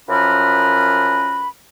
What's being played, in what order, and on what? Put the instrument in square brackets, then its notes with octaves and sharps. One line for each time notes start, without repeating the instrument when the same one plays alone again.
[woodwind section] F#2 F3 C#4 A#4 B4 B5